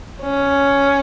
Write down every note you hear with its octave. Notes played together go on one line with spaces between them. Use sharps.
C#4